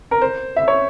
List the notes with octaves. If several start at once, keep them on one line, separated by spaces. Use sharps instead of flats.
A#4
C5
E5
C#5